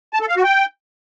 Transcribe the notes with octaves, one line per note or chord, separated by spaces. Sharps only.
A5
A4
F5
F#4
G5